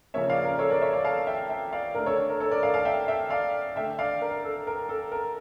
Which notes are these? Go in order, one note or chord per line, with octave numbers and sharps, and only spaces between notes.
C#3 F3 A#3 C#4 C#5 E5
D5 F5
A#4
A4 C#5
A#4 D5
C#5 E5
D5 F5
F5 A5
E5 G5
E5 G5
D5 F5
D3 A3 D4 A#4
A4 C#5
A#4
A4 C#5
A#4 D5
D5 F5
F5 A5
E5 G5
E5 G5
D5 F5
D3 A3 D4 E5 G5
D5 F5
A#4
A4
A#4
A4
A#4